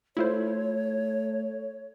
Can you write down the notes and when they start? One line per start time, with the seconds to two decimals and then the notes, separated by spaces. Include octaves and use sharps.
0.17 A3 E4 F4 C5 C#5